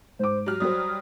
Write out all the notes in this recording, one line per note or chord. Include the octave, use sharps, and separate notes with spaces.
G#2 C5 D6
F#3 G4 F6
F#3 G3 F#4 C5 D#6